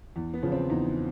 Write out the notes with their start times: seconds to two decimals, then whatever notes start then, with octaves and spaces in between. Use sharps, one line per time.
0.16 E2
0.34 B3
0.43 C#3 F3
0.52 C4
0.69 E2 D#4